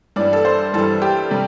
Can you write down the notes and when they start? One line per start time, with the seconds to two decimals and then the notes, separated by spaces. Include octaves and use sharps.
0.16 G2 E3 G3 D5
0.33 A4
0.45 C5
0.73 G2 E3 G3 A4
1.02 G4
1.31 C3 G3